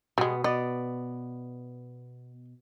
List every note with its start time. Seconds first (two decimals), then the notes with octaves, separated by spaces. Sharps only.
0.18 B2 G3 G#3 B3
0.44 B3 D5 D#5